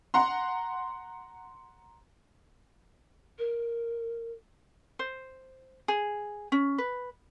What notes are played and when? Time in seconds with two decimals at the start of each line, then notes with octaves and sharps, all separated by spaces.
0.14 F#5 A#5 C6
3.38 A#4
4.99 C5
5.88 G#4
6.52 C#4
6.78 B4